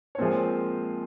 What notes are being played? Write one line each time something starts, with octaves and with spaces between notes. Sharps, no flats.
C#5
A#2 F3 G#3 C4 C5